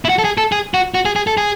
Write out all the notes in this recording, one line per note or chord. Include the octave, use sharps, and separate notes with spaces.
E4
F#4
A4
G#4
A4
G#4
F#4
F#4
G#4
G#4
A4
G#4